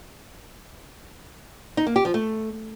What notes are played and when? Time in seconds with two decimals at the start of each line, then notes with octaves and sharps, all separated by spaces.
1.77 D#4
1.87 A#3
1.96 G4
2.05 F3
2.14 A3